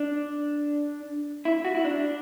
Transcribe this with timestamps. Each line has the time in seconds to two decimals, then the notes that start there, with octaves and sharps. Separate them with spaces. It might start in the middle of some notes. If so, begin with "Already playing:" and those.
Already playing: D4
1.45 E4
1.65 F#4
1.75 E4
1.84 D4